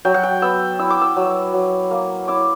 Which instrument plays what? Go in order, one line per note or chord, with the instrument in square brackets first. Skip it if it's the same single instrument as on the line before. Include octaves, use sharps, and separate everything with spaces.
[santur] F#3 G5
F#5
G5
B3 E6
E4 E6
D6
E6
F#3
F#3
A#3
E4 D6